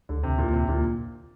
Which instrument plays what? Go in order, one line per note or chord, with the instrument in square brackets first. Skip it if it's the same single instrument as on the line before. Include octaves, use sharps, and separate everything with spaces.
[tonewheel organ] D2 [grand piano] D3
[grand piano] C3
[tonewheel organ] D2
[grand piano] A#2
[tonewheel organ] D2 [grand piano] C3
[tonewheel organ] D2 [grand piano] A#2